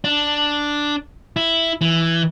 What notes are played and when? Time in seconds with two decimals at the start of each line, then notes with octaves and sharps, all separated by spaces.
0.04 D4
1.36 E4
1.81 E3